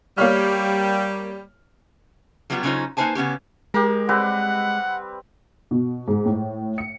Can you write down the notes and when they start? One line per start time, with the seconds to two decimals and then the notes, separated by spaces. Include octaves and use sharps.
0.18 G3 A#3 C#5 F6
2.50 F#3 G3 B3 F4 G4
2.63 C#3 F#3 C#4 D#4 F4 C5
2.97 A#3 D#4 B4 C5 G#5 A5
3.15 C#3 B3 C#4 G4
3.74 G#3 G4 A#4
4.09 G3 C4 B4 F#5
5.71 B2
6.08 G#2
6.26 A2
6.78 C#7